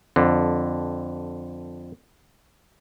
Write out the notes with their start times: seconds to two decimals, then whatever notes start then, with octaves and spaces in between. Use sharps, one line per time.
0.16 F2 D3